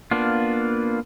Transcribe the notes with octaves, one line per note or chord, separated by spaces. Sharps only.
A#3 B3 D4 F4